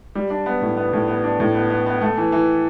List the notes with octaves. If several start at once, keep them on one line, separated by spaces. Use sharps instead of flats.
G3
D4
B3
A2
B3
A2
B3
D4
A2
B3
B3
B3
A3
E3
E3